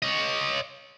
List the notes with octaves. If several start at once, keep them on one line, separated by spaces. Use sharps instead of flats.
C#5 D#5